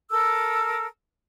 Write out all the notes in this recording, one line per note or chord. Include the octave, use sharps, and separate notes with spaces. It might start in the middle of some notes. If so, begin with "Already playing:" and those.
A4 A#4 E6